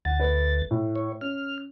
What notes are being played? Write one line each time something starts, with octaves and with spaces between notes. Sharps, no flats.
D2 F#5 A6
A3 B4
A2
C#5
C#4 F6